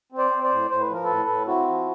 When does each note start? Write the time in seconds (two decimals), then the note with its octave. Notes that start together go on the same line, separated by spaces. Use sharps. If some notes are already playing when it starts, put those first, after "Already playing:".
0.12 C4
0.18 C5 D5
0.31 C4
0.43 C5 D5
0.51 A2
0.70 A2 C5
0.81 B4
0.89 F3 A#4
1.04 A2 A4 B4
1.29 A2
1.47 C4 E4 F#4
1.67 F3